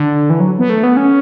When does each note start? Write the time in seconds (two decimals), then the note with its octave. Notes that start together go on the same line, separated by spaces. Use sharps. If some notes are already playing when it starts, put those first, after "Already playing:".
Already playing: D3
0.30 E3
0.40 F#3
0.59 B3
0.70 A3
0.83 B3
0.97 C#4